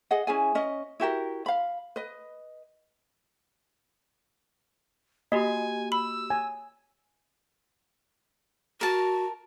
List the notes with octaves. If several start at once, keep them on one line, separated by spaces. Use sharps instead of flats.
G#4 D#5 F#5
C#4 E4 G#4 G#5
C#4 D#5
E4 F#4 G4 A#4
F5 B5
B4 D#5
A#3 F#4 G4 D#5 G#5
B5 E6
G#5
F#4 A#4 A5